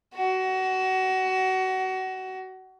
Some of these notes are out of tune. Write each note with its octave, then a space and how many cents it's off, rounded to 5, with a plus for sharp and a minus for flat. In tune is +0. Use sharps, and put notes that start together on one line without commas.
F#4 +25